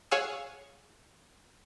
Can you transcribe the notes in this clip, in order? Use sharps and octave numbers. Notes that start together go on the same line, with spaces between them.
G#4 C#5 F5 F#5 G#5 E6